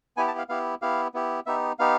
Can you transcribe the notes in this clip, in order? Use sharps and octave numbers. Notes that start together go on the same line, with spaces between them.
B3 E4 G4 G#5
A5
F5
B3 E4 G4 F5
B3 E4 G4 F5
B3 E4 G4
B3 D#4 G4 E5
B3 D#4 G4 F5